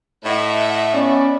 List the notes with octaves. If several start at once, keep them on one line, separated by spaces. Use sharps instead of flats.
A2 D#5 E5 F#5
B3 C#4 D5